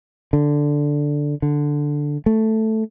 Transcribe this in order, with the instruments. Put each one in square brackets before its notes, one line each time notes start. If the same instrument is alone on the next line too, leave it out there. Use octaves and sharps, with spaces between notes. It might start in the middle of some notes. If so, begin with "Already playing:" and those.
[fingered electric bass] D3
D3
A3